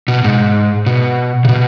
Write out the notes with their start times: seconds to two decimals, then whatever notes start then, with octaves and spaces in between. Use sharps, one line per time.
0.08 B2
0.24 G#2
0.86 B2
1.45 C#3
1.49 B2